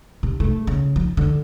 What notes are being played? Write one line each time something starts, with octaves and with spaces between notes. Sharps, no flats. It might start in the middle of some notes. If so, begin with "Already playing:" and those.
C3
A3
C#3
F3
D3